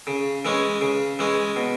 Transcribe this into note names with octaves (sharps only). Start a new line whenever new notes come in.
C#3
E3 G#3 C#4
C#3
E3 G#3 C#4
B2